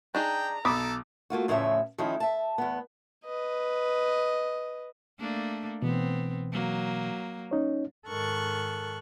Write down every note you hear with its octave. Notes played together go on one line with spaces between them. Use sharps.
D4 D#4 G#4 G5 A#5
B1 A4 B5 D6 D#6
A3 A#3 F4 F#4
E2 A2 C#3 F3 C#4 E5
D#3 F3 A3 C#4 D#4 E4
E5 A5
E2 B3
B4 D#5
A3 A#3 D4
B2 E3 B3 C4
F#3 A#3
C#4 D#4 C#5
G#2 D#3 A4 A#4 C#6 F#6